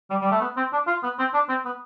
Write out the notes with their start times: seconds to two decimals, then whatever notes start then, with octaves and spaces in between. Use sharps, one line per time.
0.10 G3
0.21 G3
0.31 A3
0.41 B3
0.57 C4
0.73 D4
0.87 F4
1.03 B3
1.19 C4
1.34 D4
1.49 C4
1.65 B3